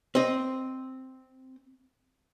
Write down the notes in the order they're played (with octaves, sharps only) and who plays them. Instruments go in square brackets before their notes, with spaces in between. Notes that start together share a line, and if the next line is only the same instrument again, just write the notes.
[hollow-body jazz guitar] C4 D#5